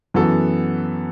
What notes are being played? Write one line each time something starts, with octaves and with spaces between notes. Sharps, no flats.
F#2 E3 B3 F#4 A4